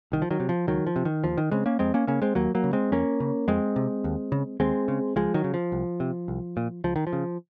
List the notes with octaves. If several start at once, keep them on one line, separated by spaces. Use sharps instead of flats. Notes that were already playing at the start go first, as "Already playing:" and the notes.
C2 D#3
F3
D#3 F#3
C3
F3
C#2 D#3 F#3
F3
C3
D#3
D#2 F3
D#3
C#3 G#3 C4
A#3 C#4
F2 G#3 C4
A#3 C#4
C#3 A#3 C#4
G#3 C4
D#2 F#3 A#3
F#3 A#3
C#3
G#3 C4
F2 A#3 C#4
C#3
F2 G#3 C4
C3
D#2
C#3
D#2 G#3 C4
C#3
C#2 F3 G#3
D#3 F#3
C#3
F3
C2
C3
C2
A#2
C#2 F3
D#3
F3
C#3